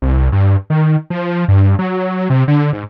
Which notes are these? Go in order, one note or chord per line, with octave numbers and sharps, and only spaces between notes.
C2
G2
D#3
F3
G2
F#3
C3
D3
G#2